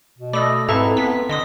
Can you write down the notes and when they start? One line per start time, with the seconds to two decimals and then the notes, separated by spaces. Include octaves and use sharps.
0.18 B2
0.33 A3 D5 D#5 B5 E6 A#6
0.69 G#2 C4 E4 A4 B4 F5 A#5
0.97 B3 B6
1.29 D3 D#5 C6 D#6